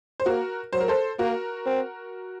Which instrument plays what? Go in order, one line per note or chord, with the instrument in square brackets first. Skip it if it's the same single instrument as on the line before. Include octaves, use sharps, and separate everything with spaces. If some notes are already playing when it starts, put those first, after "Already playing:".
[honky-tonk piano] C5
[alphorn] A#3 [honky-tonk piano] F#4 A#4
[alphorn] F#3 [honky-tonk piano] C5
[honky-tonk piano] A#4
A4 C5
[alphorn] A#3 [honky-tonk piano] F#4 A#4
[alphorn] C4